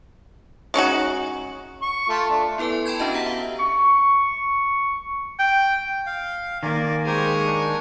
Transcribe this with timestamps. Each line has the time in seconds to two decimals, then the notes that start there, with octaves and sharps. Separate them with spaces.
0.74 G#3 C#4 D#4 F#4
1.82 C#6
2.09 A3 F4 A4
2.30 A3 D4
2.58 B3 E4 A4 B4 G#5
2.72 C6
2.86 G5 A5 B5 C6 G6 G#6
2.99 B3 C#4 D4 F#4 D#5 A5
3.14 G4 F#5 A#5
3.26 E5 F5
3.59 C#6
5.39 G5
6.06 F5
6.63 D#3 A#3 D5 G#5
7.06 G#3 G4 A#4 C5 G#5 C#6
7.45 D4